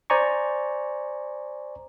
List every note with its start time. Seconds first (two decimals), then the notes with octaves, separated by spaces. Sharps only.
0.10 C5 D5 G#5 A#5 C#6